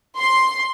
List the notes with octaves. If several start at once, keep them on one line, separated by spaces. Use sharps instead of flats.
C6